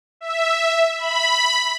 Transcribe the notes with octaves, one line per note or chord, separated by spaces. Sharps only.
E5
B5